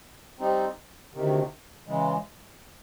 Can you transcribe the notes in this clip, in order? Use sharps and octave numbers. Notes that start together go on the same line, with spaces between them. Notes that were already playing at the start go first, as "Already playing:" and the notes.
G3 C4 D#4
D2 C3 D#3
C#3 E3 G#3